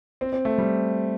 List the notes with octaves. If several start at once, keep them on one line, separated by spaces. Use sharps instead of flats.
C4
C4
A3
G3